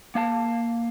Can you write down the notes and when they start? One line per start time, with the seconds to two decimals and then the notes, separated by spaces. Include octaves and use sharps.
0.15 A#3 F5 A5